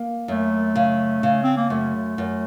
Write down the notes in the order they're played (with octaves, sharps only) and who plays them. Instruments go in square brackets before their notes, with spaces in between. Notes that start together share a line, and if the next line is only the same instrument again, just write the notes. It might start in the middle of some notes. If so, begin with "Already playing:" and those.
Already playing: [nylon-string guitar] A#3
[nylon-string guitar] F#2 [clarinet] A3
[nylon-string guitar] C#3
C#3
[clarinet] C4
A#3
[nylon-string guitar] F#2 [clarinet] A3
[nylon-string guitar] F#2